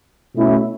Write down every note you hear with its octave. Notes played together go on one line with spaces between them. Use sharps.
B2 A3 C#4 E4